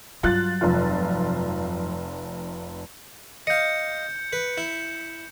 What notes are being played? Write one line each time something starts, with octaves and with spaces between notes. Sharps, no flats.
G2 F#3 F4 F#6 A6
F1 F4
D#5 F5 G6 C#7
B4
E4